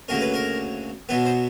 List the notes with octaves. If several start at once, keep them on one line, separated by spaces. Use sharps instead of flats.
D2 C#3 F#3 A#3 C#4 A#4
B4
A#4
B2 F#3 B3 B4
C5